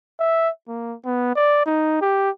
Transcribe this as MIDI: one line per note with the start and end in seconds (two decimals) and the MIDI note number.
0.20 0.50 76
0.68 0.95 58
1.05 1.35 59
1.35 1.63 74
1.66 1.98 63
2.01 2.30 67